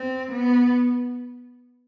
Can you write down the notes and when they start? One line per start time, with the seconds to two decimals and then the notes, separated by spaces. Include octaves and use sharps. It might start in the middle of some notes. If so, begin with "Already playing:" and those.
Already playing: C4
0.32 B3